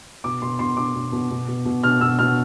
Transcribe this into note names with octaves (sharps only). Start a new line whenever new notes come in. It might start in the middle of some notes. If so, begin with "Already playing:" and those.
B2 D6
B2 C6
B2 C6
B2 D6
B2
B2
B2
B2
B2
B2 F6
B2 E6
B2 F6